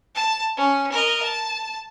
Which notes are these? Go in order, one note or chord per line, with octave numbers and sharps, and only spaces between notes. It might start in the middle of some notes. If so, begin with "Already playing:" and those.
A5
C#4
A#4 D#5
A5